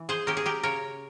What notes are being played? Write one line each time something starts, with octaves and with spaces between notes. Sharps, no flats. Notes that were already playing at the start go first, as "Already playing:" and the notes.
Already playing: E3
G#4 C5
A#3 C#4 G4 A#4
G#4
G4 A#4
C#3 A#4 C#5